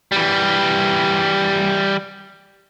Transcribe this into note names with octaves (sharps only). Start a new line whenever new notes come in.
E3 G3